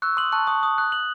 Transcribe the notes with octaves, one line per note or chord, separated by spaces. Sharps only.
C#6 E6 F#6
C6 D#6 F#7
A5 C#6 F#6
A5 C#6 D#6
D#6
F#6
F#7